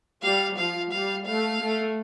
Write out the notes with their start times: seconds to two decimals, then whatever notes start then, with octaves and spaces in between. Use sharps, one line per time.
0.23 G3 F5
0.58 F3 F5
0.92 G3 F5
1.26 A3 F5
1.61 A3